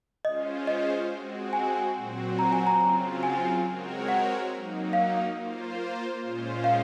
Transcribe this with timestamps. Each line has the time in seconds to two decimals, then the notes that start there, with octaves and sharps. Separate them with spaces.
0.25 G#3 C#4 F4 C5 D#5
0.67 D#5
1.10 G#3 C4 F#4
1.53 G#5
1.95 A#2 F#3 C4 F#4
2.39 A#5
2.53 G#5
2.67 A#5
2.80 C#3 F#3 C4 F4 A#5
3.23 G#5
3.65 G#3 C4 F#4 A#4 C#5
4.09 F#5
4.51 F#3 A#3 D#4
4.93 F5
5.37 A#3 F4 C5
6.21 A#2 G#3 C#4 F4 C5
6.64 F5